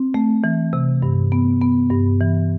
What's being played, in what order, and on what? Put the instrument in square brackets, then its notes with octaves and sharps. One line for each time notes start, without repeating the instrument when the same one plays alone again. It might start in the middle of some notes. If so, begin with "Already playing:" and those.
Already playing: [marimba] C4
A3
E3
C3
G2
B3
B3
G2
E3